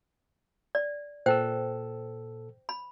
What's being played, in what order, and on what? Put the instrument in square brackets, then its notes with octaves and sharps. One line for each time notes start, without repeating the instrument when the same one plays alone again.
[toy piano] D5
[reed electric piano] A#2 A4 E6 [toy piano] C5 G5
[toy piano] B5